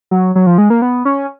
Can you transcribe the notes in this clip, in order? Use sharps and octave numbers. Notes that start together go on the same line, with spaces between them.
F#3
F#3
F3
G#3
A#3
B3
C#4